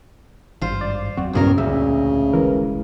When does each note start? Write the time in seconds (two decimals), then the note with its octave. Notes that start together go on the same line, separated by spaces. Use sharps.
0.61 G#1 G2 F4 C5
0.81 D5
1.17 E2 F#3 C4 F#4
1.33 E1 B1 G2 A#2 C#3 A#4
1.58 D2 C#3 E5
2.33 E1 C2 E3 G#3 A#4